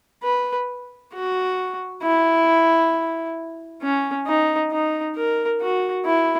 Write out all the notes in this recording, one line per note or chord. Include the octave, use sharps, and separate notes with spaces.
B4
F#4
E4
C#4
D#4
D#4
A#4
F#4
E4